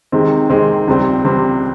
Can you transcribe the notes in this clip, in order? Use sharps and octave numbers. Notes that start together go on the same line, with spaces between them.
C3 D#3 G#3 C4
C3 D#3 G#3 C4
C#2 C3 G3 C4
C#2 C3 G3 C4